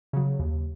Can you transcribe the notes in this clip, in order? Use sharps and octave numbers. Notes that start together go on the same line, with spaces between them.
C#3 F#3
D#2